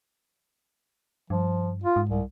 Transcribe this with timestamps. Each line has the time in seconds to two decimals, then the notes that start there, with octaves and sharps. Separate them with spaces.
1.30 G2 F3
1.84 F4
1.96 G#2
2.09 C2